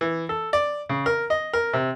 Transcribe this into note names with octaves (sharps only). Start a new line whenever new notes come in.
E3
A4
D5
C#3
A#4
D#5
A#4
C3